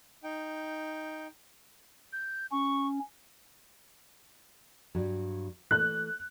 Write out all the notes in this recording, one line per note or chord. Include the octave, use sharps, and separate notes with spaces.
D#4 G5
G6
C#4 C#6
G2 F#3
E3 A3 F#6